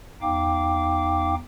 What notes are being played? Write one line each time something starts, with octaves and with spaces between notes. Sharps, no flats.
E2 D#4 F5 G5 D6